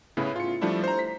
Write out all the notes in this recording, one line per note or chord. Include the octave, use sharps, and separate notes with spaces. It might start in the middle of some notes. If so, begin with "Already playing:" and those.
A2 C#3 B3 E4
F4 C#7
F3 G3 A3 D4 E4
C5 A#5
B6